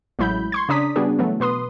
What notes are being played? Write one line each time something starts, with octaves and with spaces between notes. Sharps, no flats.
A1 F#3 G#3 E4 B5 G6
C6 C#6 G#6
C#3 D4 D5 A#5 D#6 B6
C#3 G3 B3 D4 F#4 G#4
E3 F#3 A3 B3
B2 B4 C6 D#6